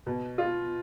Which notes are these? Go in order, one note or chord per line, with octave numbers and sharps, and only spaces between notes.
B2
F4